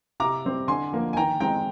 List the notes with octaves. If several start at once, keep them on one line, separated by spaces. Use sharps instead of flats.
C3 A#5 D6
G3 C4
D3 G#5 C6
F3 A#3
G#5
D#3 G5 A#5
G#3 C4 G5 A#5